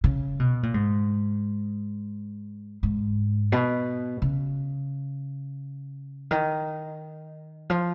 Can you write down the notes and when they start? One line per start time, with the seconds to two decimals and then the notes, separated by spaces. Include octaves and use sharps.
0.04 C#3
0.40 B2
0.63 A#2
0.74 G#2
2.83 G#2
3.52 B2
4.22 C#3
6.31 D#3
7.70 F3